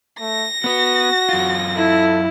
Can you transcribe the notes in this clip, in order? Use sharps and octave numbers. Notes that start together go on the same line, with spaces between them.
A3 A#6
B3 F#4 B4
F#2 F4
E4 A4